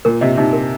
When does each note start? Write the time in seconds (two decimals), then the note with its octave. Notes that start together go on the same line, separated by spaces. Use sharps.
0.05 A#2 A#4
0.21 C3 D#5
0.37 C3 D#4
0.53 A#4